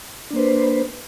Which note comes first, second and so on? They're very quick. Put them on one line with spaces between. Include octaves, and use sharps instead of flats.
D4 A#3 C5 B4